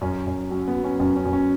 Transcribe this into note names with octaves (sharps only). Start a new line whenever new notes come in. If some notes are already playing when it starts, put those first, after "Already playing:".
F#2 C#4
F#2
F#3 C#4
B3
F#3
C#4
F#2 C#4
C#4
F#2
C#4